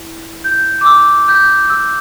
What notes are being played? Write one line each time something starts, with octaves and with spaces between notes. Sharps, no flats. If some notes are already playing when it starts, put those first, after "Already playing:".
Already playing: E4
G6
D6
E6
G6
E6